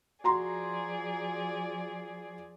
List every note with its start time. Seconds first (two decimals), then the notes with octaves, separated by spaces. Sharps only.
0.24 F3 F#4 G#4 D5 A#5 C6